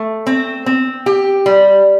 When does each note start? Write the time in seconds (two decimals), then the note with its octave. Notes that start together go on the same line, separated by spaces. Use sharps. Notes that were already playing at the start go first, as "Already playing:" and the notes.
Already playing: A3
0.27 C4
0.66 C4
1.06 G4
1.46 G3